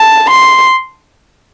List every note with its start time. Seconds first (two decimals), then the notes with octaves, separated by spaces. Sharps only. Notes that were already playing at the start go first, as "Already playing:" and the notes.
Already playing: A5
0.30 C6